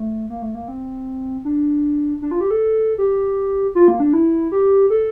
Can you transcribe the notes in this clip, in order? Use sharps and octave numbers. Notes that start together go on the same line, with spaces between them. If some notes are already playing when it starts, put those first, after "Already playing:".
Already playing: A3
A#3
A3
A#3
C4
D4
D4
F4
G4
A4
G4
F4
A#3
D4
E4
G4
A4